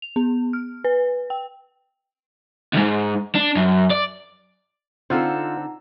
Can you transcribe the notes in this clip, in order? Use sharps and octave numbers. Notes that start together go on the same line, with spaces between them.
F7
B3
F6
B4
G5
D2 G#2
D4
F#2
D5
D3 C4 D#4 F4 A4 C5 F#5 A#5